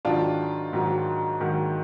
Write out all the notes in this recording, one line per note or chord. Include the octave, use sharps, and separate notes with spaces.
G#2 D#3 F#3 D4 F4
G#2 D#3 F#3
G#2 D#3 F#3